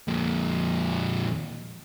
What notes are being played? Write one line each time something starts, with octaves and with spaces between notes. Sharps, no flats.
F2 A#2